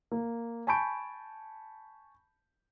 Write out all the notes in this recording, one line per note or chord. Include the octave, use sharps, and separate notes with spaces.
A#3
G#5 A5 B5 C#6 G6 D7